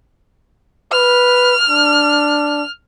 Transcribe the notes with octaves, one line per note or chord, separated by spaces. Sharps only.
B4 F6
D4